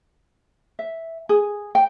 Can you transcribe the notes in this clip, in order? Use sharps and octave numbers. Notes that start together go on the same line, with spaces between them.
E5
G#4
G5